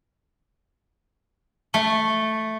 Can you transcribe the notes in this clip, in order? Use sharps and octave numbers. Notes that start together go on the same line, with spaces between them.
A3